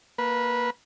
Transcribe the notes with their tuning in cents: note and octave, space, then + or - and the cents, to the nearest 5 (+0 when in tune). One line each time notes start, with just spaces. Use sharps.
A#3 +0 B4 -15